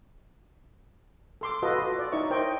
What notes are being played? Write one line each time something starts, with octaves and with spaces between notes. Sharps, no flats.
A4 C6 D6
F4 F#4 A4 B4 D#5
F#4
D5
D#4 E4 C#5 D5 E5 C#6
A#4 C5 C#5 D#5 G5